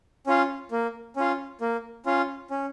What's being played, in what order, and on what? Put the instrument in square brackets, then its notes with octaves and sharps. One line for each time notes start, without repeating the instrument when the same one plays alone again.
[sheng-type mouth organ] C#4 F4
A#3
C#4 F4
A#3
C#4 F4
C#4